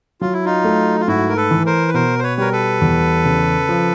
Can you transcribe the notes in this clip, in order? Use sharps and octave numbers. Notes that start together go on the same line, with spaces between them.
F#3 F4
E4
D#4 F4
A3
F4
G#2 E4 F#4
A#4
A4 B4
E3
A#4 C5
B4
B2 A#4 C5
C5
B4 C#5
G3 A#4
A4 B4
E2
C#3
F3